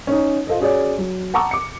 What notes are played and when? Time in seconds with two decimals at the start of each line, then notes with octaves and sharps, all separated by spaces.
0.07 C#4 D#4
0.47 F4 A4 C5 D#5
0.60 C#4 F#4 G#4 C#5 D5
0.98 F#3
1.34 F#5 A5 A#5 C#6 D6 E6
1.51 D6 C#7